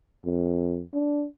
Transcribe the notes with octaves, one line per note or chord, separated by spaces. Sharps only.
F2
D4